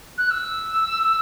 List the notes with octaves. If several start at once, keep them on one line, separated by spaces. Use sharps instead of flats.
F#6
E6